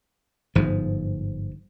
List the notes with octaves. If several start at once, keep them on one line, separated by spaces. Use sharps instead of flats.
G1 G#2 F3